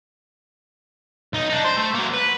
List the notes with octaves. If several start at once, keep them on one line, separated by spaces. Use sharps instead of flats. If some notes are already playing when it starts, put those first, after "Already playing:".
B1 D#4
D4 D#4
C5
A3
F#3 A#3
B4